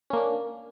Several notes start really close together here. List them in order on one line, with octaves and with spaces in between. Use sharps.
C#4 A#3 D4